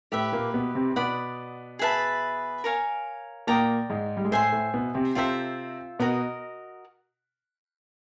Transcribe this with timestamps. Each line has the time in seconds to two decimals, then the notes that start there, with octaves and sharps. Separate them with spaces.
0.12 A2 A3 G4 B4 E5
0.32 A#2 A#3
0.54 B2 B3
0.75 C3 C4
0.90 C4
0.96 B2 B3 D5 F#5 B5
1.79 G#4 B4 E5 A5
2.64 A#4 C#5 F5 G#5
3.47 A#2 A#3 D5 G5 A#5 D#6
3.90 G#2 G#3
4.17 G3
4.25 G#3
4.31 A2 A3 C5 E5 G#5 C6
4.52 A2 A3
4.74 B2 B3
4.95 C3 C4
5.15 C3 C4 F4 A4 C5 E5
5.99 B2 B3 F#4 A#4 D#5